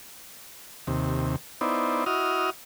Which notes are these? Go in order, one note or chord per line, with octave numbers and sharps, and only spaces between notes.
D#2 C3
B3 D#4 E4 C5 D5
E4 F#4 D#5 D#6 F6